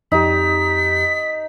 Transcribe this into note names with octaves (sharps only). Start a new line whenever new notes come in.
F2 D#4 G4 B6